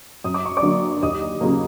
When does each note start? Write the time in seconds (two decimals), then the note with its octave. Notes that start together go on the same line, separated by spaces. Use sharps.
0.24 F#2 D#6
0.34 D6
0.46 C#6
0.57 D5 D6
0.62 D3 F#3 A#3
1.03 D#2 D#5 D#6
1.40 C#3 F#3 A#3